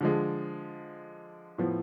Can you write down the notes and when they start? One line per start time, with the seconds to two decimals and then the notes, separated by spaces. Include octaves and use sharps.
0.01 D3 F3 G#3
1.58 A2 F3 B3